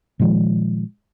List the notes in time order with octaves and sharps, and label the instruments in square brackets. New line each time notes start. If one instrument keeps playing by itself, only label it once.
[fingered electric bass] A#2 D#3 F3 G#3